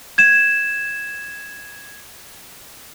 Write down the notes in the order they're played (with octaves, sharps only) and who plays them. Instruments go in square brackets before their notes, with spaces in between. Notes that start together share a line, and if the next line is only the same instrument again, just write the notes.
[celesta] G#6 E7